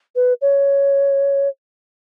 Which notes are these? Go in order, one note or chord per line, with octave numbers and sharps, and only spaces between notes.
B4
C#5